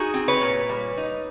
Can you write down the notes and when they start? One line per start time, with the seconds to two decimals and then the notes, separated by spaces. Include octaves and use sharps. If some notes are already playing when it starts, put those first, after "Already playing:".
Already playing: D#4 F#4 G#4
0.14 C4
0.28 B4 C#5
0.41 A#2
0.69 G3
0.97 D#4